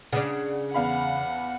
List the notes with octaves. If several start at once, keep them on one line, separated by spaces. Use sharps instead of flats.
C#3 D4 F#5
E2 F5 F#5 B5